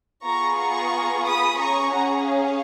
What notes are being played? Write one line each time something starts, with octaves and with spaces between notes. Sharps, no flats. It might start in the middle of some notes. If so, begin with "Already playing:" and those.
B3 F4 G#4 A#5 C#6
A#5 C#6
B5 D#6
C#4 G#4 A#5 C#6
F#5 A#5
C#5 F5